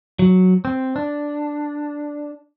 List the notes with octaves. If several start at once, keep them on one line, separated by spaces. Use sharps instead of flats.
F#3
C4
D4